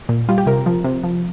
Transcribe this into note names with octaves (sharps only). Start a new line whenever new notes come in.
A#2
G3 F4
G4
C3 A#4
F3
C3
F3